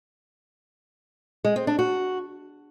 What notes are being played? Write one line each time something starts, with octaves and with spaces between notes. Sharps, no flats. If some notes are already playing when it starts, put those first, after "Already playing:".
G#3
C4
D4
F#4